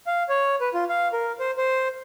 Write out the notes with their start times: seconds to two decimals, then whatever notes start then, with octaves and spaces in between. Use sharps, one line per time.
0.07 F5
0.29 C#5
0.61 B4
0.74 F4
0.89 F5
1.13 A#4
1.40 C5
1.57 C5